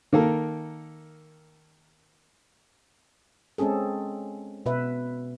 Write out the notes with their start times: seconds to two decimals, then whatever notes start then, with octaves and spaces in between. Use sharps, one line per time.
0.13 D#3 A#3 A4
3.58 G#3 C4 C#4 G#4 A4
4.66 B2 B4 E5